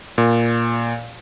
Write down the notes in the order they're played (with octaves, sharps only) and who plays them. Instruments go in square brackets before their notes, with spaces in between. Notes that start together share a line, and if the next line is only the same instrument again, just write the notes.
[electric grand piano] A#2